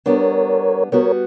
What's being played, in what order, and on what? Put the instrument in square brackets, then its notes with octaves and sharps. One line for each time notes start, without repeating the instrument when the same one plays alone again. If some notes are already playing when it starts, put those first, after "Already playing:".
[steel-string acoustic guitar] G3 B3 D4 [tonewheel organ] A#4 C#5
[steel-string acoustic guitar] G3 B3 F#4 B4 [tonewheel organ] A#4 C#5